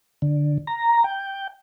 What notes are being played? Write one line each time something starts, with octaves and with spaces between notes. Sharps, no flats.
D3
A#5
G5